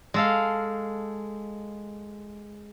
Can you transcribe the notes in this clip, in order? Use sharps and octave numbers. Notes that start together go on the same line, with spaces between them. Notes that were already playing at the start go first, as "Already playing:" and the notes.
G#3 A4 F5